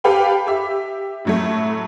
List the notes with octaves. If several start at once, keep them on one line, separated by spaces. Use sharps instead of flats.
G4 A4 B4 F5 G5 B5
G4 E5
A2 F#3 A3